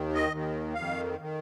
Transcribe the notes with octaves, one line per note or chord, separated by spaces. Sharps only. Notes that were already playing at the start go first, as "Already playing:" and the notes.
Already playing: D#2 D#3
D#5
D#2 D#3
F2 D#3 F5
D#3